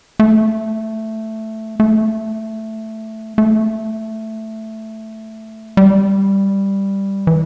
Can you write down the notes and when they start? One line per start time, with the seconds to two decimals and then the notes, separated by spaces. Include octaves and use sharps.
0.20 A3
1.80 A3
3.38 A3
5.77 G3
7.27 E3